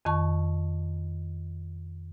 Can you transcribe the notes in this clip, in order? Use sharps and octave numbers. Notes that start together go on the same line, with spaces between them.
F2 D#3 A5 C#6